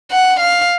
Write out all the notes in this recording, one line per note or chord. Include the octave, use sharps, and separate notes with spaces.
F#5
F5